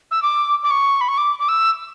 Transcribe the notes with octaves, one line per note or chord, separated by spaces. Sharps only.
E6
D6
D6
C#6
B5
C#6
D6
D6
E6